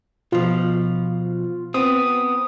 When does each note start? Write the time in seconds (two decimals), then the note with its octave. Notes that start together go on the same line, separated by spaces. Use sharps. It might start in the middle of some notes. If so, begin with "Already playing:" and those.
0.32 B2 F3 F4
1.74 B3 C4 D#6